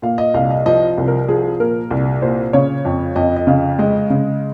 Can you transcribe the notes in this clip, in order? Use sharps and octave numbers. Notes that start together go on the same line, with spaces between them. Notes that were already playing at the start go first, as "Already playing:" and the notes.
A#2 F5
D#5
C2 F5
D#5
F3 D#5
C2
A#4
F3 G#4
A#2 A#4
C2
A#2 C5
C#3 C#5
F2
F2 D#5
D#5
C#3 F5
G#3 D#5
C#3